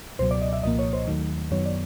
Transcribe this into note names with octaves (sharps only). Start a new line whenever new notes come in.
C#2 B2 F#3 C5
D5
D#5
E5
C2 A#2 F3 A#3 D#5
C#5
C5
D#2 D#3 F#3 A3
F#2 D#3 F#3 B3 C#5
D5